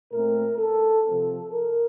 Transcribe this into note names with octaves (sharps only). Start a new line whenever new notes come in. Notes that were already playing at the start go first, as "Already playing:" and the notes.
A#2 A3 C4 A#4
A4
C3 F3 C4 A4
A#4